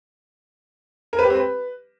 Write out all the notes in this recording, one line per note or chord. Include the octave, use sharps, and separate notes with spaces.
A#4
B4
G4
C4
B4